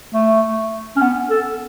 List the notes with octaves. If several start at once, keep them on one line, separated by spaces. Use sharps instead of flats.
A3
C#4
B3
A4